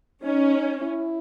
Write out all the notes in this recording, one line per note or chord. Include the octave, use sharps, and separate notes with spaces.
C#4 D#4
E4